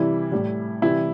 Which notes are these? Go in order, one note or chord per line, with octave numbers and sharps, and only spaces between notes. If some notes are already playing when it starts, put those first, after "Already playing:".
Already playing: C3 E3 G3 E4
A2 G3
C3 E3 G3 E4